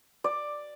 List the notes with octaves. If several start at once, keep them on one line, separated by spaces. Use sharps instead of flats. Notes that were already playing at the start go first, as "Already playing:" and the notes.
D5